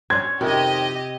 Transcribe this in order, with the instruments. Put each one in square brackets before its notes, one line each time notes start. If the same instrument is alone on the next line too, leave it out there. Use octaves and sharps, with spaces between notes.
[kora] C#4 C5 [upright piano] G#6
[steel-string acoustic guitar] F2 D#3 [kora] C3 [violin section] G4 D#5